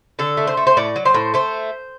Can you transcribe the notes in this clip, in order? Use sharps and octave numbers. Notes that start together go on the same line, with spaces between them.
D3 A4
A3
C5
A3
C5
A2 D5
F#3
C5
A2
A3 C5